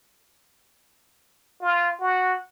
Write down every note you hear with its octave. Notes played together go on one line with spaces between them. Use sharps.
F4
F#4